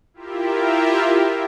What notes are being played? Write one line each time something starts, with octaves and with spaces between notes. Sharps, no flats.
E4 F4 G4 A#4 E5